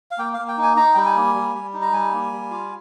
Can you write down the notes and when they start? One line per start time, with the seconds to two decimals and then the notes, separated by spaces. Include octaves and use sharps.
0.11 F5
0.18 A#3 G5
0.34 A#3 F5
0.48 G5
0.58 D#4
0.63 G#5
0.77 D#4 A#5
0.94 G3 G5
1.06 G#5
1.16 A#3
1.35 G3
1.54 G3
1.74 D#4
1.82 A#5
1.93 G3 G#5
2.12 A#3
2.32 G3
2.51 F4